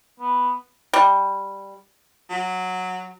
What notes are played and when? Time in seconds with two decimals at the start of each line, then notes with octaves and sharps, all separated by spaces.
0.20 B3
0.93 G3
2.30 F#3